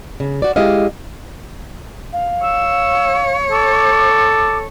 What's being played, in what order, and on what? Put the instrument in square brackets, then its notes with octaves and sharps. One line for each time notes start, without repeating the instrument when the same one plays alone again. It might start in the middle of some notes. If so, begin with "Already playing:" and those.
[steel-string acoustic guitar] C#3
F#4 D5
G#3 E4 G4 D#5 F5
[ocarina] F5
[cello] C#5 [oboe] E6
[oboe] A4 [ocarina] D6